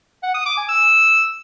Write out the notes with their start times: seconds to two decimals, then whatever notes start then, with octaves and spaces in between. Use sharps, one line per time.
0.23 F#5
0.34 D#6
0.46 D6
0.57 G#5
0.69 E6